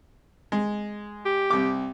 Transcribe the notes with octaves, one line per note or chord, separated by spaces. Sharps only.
G#3
G4
C2 D6